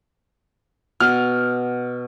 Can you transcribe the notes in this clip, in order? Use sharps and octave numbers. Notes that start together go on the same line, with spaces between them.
B2 F6